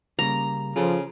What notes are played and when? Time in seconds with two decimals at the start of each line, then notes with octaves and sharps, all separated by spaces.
0.19 C#3 G3 A#3 A#5
0.76 C#3 F3 F4 A4